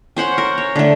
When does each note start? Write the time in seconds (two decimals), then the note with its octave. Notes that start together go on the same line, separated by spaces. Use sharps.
0.16 C#4 C5 F#5
0.38 A#4
0.58 C#5
0.76 D3 A3